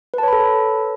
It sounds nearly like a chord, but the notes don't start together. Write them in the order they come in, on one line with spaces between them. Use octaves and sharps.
B4 A5 C#5 B5 A4